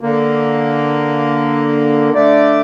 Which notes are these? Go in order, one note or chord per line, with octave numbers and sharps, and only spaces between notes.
D3 A#3
D3 A3 D5